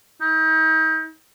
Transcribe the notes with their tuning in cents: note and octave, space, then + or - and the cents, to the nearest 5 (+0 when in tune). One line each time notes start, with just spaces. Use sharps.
D#4 +40